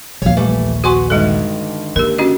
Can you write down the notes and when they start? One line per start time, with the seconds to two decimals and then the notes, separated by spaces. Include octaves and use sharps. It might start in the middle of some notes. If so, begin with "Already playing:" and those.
0.22 A#1 D#2 C#5 F5
0.37 E3 G3 A3
0.84 F#4 B4 F#5 G#5 C6 C#6
1.10 G2 D3 D#3 G#3 A4
1.96 A#3 G4 A#4
2.18 C#4 F#4 D#5